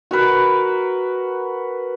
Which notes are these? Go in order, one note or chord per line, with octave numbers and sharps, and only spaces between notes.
F#4 A#4 B4